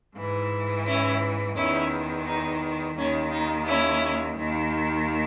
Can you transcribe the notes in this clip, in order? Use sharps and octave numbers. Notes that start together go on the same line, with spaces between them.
G#2 E3
C#4 E4
E2 D#3 C#4 E4
D#4
D#2 D#3 C#4
D#4
C#4 E4
D#2 D#3